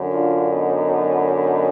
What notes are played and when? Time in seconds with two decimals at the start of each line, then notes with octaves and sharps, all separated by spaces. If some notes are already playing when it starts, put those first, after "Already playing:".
Already playing: F#2 D3
0.13 D4 F4
0.51 B3 D#4
1.29 B3 D#4